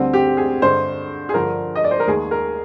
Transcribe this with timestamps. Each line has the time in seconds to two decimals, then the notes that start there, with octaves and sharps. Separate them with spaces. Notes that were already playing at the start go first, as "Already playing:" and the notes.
Already playing: D2 D3 G3 C4
0.13 G4
0.37 G#4
0.62 G2 D3 G#3 C5
1.29 G#4
1.34 G2 D3 F3 A#4
1.75 D#5
1.84 D5
1.91 C5
2.00 A#4
2.07 D#2 D#3 G#3 G#4
2.31 A#4